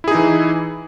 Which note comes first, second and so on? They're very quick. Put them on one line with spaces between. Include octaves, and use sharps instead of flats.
E4 G#4 D#4 E3